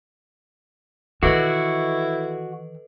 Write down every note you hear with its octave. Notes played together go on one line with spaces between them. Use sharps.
D#3 E3 E4 F#4 A4 B4 D#5